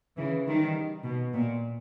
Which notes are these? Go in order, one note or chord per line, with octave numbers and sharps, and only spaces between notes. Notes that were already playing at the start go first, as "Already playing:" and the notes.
C#3 E3
D#3 G3
B2
A#2